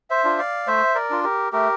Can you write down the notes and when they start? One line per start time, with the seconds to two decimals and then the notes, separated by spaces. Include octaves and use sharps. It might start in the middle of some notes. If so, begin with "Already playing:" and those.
0.10 C5 E5
0.24 D4 F4
0.38 D5 F5
0.67 A3 C5 E5
0.95 A#4 D5
1.10 D4 F4
1.24 G4 A#4
1.52 A3 G4 A#4